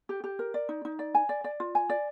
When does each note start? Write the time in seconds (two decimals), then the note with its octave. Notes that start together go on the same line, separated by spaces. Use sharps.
0.09 G4
0.24 G4
0.39 A#4
0.54 D5
0.69 D#4
0.85 D#4
0.99 D5
1.14 G#5
1.29 D5
1.44 D5
1.60 F4
1.75 G#5
1.89 D5